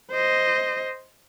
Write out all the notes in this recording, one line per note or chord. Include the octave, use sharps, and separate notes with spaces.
C5 D#5